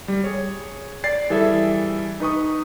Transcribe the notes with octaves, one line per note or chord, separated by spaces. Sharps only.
G3
G#4 C#5
D5 A6 C7
E3 G3 G#4 A4 E5
D#4 B4 C#6 D#6